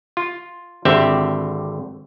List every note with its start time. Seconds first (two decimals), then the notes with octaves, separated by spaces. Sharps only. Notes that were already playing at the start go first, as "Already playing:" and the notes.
0.17 F4
0.85 G#1 D3 C4 G4 E5